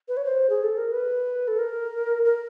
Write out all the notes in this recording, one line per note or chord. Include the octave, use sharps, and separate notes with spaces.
B4
C#5
C5
G#4
A4
A#4
B4
A4
A#4
A#4